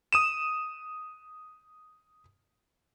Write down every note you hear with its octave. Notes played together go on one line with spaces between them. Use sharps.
D#6 D#7 E7